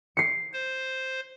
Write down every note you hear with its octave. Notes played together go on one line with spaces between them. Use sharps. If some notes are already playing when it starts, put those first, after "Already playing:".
C7 C#7
C5